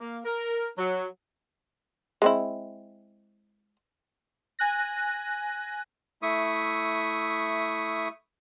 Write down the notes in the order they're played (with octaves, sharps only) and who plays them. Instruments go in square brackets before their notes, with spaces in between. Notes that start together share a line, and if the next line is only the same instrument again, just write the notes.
[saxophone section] A#3
A#4
F#3
[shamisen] G#3 C4 E4
[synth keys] G#5 F#6 A#6
[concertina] A3 E4 E5 C#6 D#6